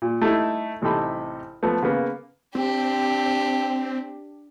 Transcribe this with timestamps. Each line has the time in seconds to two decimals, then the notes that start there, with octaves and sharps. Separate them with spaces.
0.02 A#2
0.22 A3 D#4 E4
0.82 A1 C3 D#4 A4 B5
1.63 F3 A3 B3
1.83 C#3 A#3 B3
2.55 C4 D4 G4